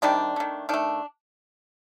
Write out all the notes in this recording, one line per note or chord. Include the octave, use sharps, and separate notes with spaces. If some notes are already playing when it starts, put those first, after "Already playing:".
C3 D#3 G3 D4
D#3 A3
D#3 A3 D4